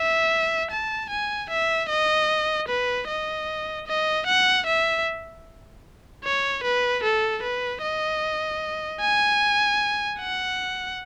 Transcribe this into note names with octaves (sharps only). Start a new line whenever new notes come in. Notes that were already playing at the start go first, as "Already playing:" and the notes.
Already playing: E5
A5
G#5
E5
D#5
B4
D#5
D#5
F#5
E5
C#5
B4
A4
B4
D#5
G#5
F#5